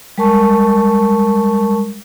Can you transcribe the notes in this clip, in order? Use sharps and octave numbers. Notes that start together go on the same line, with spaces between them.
G3 G#3 A#4 A5 C#6